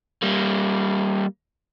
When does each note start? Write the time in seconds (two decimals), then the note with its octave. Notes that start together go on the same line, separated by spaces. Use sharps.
0.23 G3 A#3